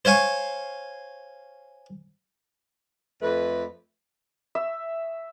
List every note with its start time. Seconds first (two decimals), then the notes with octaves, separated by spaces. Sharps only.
0.05 C5 C#5 F5 G#5 C#6
3.21 F2 A3 B4
4.55 E5